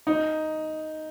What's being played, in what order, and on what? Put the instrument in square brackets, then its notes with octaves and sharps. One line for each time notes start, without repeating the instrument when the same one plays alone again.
[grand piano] D#4